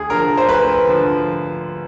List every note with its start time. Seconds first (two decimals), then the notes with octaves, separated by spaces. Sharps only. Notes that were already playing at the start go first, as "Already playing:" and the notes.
Already playing: D2 G#4
0.10 D3 F3 A#4
0.37 C5
0.49 D2 B4
0.88 D3 F3